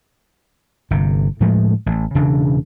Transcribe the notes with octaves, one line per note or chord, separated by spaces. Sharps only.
G1 C3
A2 F3 G#3 A3
A1
E1 C#3 E3 D4